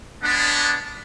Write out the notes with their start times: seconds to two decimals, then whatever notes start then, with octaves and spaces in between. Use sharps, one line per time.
0.22 G#3 B3 D4